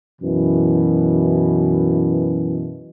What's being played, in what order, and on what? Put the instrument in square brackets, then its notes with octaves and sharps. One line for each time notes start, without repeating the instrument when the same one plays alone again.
[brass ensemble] F#2 B2 E3